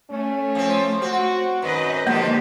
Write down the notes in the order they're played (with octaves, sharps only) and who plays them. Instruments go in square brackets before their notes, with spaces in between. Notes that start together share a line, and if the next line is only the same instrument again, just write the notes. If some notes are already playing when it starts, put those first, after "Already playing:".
[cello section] A3 [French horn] C#4
[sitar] F3 C4
[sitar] C4 [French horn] F#4
[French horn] F#2 [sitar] D#3 [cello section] B4 D#5
[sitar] B2 F3 [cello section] D3 G#3 G4 [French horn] D#3 [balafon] A#3